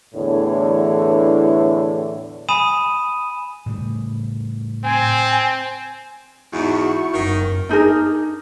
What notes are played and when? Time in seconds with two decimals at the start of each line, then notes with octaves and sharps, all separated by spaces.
0.14 E2 A2 D3 E3 D4 C#5
2.49 G#5 B5 D#6 D#7 E7
3.66 A2 C#3 G3
4.84 C4 G#5
6.53 E2 G#2 E4 F#4 C#6
7.13 F#1 F#2 D#3
7.69 D4 D#4 G#4 A#4